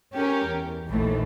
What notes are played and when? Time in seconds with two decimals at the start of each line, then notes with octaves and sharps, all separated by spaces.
0.12 C#4 G4 A#4
0.47 E2
0.88 A#1 D#2 E3 A3